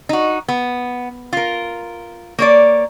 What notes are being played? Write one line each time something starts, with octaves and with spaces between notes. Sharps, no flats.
D#4 F#4
B3
F4 A#4
A#3 C#5 D5